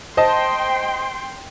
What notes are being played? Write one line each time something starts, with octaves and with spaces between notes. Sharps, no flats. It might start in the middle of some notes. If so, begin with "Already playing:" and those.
C5 D#5 G5 A5 C6